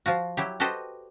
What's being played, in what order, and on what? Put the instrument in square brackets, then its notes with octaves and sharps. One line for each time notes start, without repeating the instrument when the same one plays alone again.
[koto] F3 F4 F#4
F#3 E4 G4
F#4 G4 A4 B4 C5 D#5